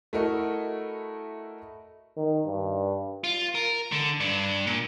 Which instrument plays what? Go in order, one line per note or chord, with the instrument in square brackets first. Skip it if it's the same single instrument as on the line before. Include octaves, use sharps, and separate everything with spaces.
[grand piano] A3 E4 F#4 A#4 D#5
[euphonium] D#3
G2
[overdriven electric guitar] F4
A#4
D3
G2 D4
A#2